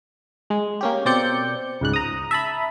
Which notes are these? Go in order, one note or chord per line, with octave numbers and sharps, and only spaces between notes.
G#3
A#3 C#4 G4
B2 C4 D5 G6 C#7
C#2 G#2 F#6
A#5 D#6
E5 A5 B5